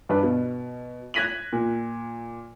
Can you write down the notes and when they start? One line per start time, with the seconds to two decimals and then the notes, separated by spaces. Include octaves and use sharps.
0.09 G2 D4 B4
0.23 B2
1.14 F#6 G#6 A#6 B6 D#7 F#7
1.53 A#2